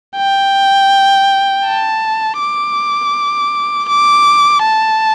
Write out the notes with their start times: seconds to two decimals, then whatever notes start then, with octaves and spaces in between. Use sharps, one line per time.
0.17 G5
1.65 A5
2.40 D6
3.88 D6
4.63 A5